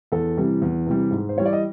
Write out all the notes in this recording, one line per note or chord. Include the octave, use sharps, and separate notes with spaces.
E2 A4
C3 E3 G3
E2
C3 E3 G3
G#2
C5
E3 G3 C#5
D5
D#5